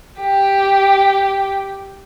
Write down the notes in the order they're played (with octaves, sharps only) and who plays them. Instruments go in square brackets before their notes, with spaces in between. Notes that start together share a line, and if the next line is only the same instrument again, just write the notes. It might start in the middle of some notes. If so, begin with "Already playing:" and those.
[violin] G4